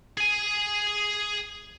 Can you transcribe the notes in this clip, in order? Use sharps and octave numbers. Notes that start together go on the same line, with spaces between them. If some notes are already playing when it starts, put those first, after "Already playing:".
G#4 G#5